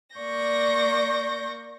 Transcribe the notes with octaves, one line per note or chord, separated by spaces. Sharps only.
A#3 D5 C#6 G6 A#6